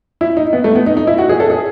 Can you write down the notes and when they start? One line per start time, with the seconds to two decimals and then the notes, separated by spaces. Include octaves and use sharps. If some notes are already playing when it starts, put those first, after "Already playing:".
0.21 E4
0.37 D#4
0.53 B3
0.64 A3
0.76 B3
0.86 D#4
0.97 D#4
1.07 E4
1.18 F#4
1.29 G#4
1.40 A4
1.50 G#4